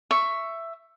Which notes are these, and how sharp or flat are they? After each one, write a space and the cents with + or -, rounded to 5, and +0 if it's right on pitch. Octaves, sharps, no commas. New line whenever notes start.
E5 +10 C#6 +0